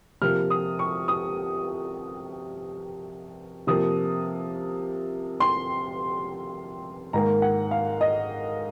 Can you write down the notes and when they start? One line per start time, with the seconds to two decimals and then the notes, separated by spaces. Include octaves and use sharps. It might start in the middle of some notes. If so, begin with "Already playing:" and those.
0.22 C3 F3 A#3 F6
0.50 D#6
0.79 C#6
1.08 D#6
3.67 C3 F3 A#3 D#6
5.40 C6
7.13 G#2 D#3 A#3 A#5
7.42 F#5
7.71 F5
8.01 D#5